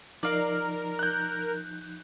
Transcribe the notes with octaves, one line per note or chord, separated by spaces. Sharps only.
F3 D#4 A#4 D5 F5
F#6 G6